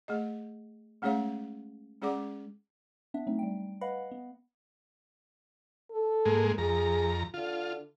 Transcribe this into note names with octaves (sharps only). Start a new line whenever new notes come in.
A3 G#4 D#5
G#3 A3 C#4 G#4 C#5 F5
G#3 C#4 G#4 D5 F#5 D6
B3 D4 E5
F#3 A3 C4 D#4
G3 G5
B4 D#5 F5 F#5 B5
B3
A4
G#2 G#3 A#3
F2 G#4 A#5
D3 F4